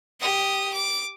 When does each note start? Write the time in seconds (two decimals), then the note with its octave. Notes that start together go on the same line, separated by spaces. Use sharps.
0.21 G4 D#6
0.73 D6